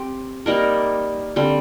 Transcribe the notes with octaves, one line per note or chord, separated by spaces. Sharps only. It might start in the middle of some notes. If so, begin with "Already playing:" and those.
Already playing: C4 G4
G3 A#3 D#4 A#4
D3 G3 C4